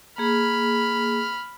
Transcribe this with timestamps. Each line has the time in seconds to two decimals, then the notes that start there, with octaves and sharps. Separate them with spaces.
0.18 A#3 G#4 B5 F6